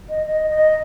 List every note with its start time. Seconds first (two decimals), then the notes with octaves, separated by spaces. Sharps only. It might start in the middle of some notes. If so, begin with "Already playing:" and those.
0.09 D#5
0.26 D#5
0.50 D#5